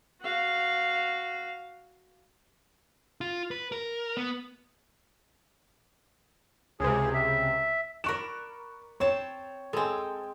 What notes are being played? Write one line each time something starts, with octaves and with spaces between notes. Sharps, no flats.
F#4 F5
F4
B4
A#4
B3
C#2 C3 G#4
E5
A#4 D5 B5 C#6 F#6 E7
C4 C5 C#5 A5
G#3 C4 A4 G#5